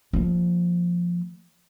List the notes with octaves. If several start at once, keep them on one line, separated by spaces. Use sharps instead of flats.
F3 A#3